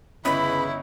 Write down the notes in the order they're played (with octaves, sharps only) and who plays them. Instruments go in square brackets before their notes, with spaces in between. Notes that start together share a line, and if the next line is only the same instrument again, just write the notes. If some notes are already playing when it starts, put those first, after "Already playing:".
[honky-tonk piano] G1 C#4 D#5 [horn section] C#3 E3 [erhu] E4 [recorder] B5